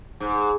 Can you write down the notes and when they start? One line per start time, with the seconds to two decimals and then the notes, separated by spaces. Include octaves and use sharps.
0.20 G#2